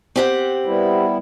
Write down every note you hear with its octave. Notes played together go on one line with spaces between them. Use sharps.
C4 G4 F#5
G3 B3 E4